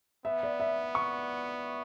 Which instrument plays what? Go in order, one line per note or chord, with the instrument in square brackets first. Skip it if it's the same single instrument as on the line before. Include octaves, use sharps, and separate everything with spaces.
[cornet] B3 [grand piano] E5
[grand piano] D5
E5
C#6